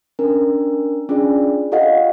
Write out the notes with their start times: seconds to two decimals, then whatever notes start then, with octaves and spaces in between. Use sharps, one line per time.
0.19 C#4 D4 A#4
1.09 C#4 D4 F4 G#4 D5
1.72 F4 G4 A4 D#5 F5 F#5